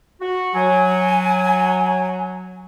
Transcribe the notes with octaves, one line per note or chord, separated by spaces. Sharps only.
F#4
F#3 G#5